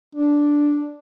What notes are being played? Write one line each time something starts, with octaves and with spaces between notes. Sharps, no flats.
D4